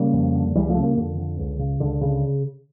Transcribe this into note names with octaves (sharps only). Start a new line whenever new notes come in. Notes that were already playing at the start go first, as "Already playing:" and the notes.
Already playing: C#3 G3 A#3
F2
D3
C#2 E3 G3
F3 A3
C#3
G3 A#3
F2 D3
D3
C#2
C#3
C#2 D3
C#3